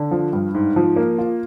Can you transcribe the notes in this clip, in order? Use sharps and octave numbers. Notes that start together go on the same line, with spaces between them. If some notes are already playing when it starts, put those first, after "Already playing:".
Already playing: D3
F3
G2
G#2
F3
A#3
F4